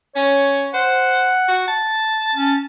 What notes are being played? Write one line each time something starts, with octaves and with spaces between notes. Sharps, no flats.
C#4 C#5
C5 F#5
F#4
A5
C#4